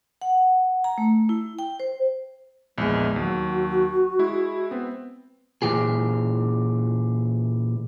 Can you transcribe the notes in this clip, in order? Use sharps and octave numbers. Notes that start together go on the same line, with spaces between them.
F#5
A#5
A3
E4
G5
C5
A#1 E2 G#3 G#5
D#2 F#3 F#4
G#3 E4
B3 C4
A#2 D#3 E3 G4 G#4